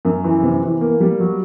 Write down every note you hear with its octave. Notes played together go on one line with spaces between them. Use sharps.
F#2
E3
C3
E3
A#3
G3
F#3